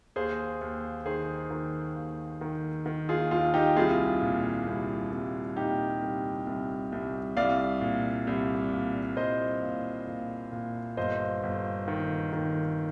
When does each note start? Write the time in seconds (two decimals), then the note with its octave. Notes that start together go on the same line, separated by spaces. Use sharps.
0.16 D#2 G#4 C5
0.61 D#2
1.05 D#3 G#4 C5
1.51 D#3
1.95 D#2
2.41 D#3
2.86 D#3
3.09 F4 G#4
3.31 D#2 F4
3.54 D#4 G4
3.76 C2 F4 G#4
4.22 A#2
4.67 C2
5.12 C2
5.56 A#2 D#4 G4
6.02 C2
6.47 C2
6.92 C2
7.36 C2 D5 F5
7.81 A#2
8.27 C2
8.72 A#2
9.17 C2 C5 D#5
9.62 A#2
10.07 A#2
10.52 A#2
10.97 G1 C5 D#5
11.43 G1
11.88 D#3
12.33 D#3